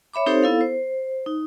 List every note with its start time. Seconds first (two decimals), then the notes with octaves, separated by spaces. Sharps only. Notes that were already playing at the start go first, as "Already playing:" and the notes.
0.14 C#5 E5 B5 D6
0.26 C4 D#4 G4 A4 C5 C#5
0.43 B3 E4 A4 F5
0.61 C5
1.26 D#4